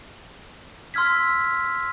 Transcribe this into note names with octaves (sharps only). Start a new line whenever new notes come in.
C6 E6 F6 G#6 B6